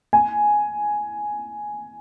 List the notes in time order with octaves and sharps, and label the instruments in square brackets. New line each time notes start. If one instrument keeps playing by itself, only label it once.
[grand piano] G#5